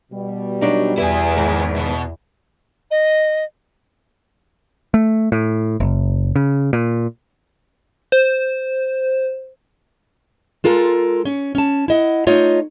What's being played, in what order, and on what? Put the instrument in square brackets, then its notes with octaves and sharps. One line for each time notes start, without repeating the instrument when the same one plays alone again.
[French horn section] B2 G3
[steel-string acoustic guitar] F#3 D4 D#4
[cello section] E2 [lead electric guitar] E4 G#4 [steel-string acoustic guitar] B4
[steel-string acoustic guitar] G#2 D#3 D#4
[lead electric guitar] B2
[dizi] D#5
[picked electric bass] A3
A2
F#1
C#3
A#2
[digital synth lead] C5
[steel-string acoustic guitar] G#3 F4 A4 A#4
C#4
C#4 A5
E4 D#5 F#5
A3 D#4 F4 C#5 D#5